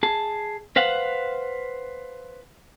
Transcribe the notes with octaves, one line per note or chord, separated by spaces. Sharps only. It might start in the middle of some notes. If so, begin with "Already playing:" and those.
G#4 A5
B4 C5 F5 F#5